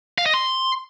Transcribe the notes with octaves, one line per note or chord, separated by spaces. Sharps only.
F5
D#5
C6